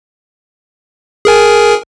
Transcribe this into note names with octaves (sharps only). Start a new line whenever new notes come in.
G#4 A#4 G#5